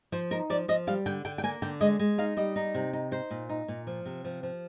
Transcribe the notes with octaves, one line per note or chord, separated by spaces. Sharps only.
F3 C5
D#4 A#4
F3 D5
F3 D#5
G3 F5
D3 G5
D3 G5
G5
A#3 G#5
D3 G5
G#3 D#5
G#3
D#4 F5
G3 D#5
D#4
C3
D#4
D#4 C5
A#2
D#4
A#2
F3
C3
F3
F3